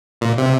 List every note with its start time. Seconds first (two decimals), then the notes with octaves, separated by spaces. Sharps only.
0.21 A#2
0.38 C3